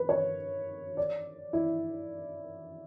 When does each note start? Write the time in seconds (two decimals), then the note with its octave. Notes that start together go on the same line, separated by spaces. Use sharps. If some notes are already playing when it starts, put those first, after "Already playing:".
Already playing: B4
0.09 C#5
0.97 D5
1.53 E4